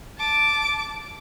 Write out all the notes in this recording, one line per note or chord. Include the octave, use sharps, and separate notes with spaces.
A5 D6